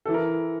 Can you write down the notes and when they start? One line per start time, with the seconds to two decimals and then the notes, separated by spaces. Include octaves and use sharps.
0.05 A4
0.08 E3
0.14 A#4